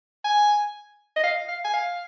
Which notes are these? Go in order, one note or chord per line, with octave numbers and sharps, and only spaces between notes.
G#5
D#5
F5
F5
G#5
F5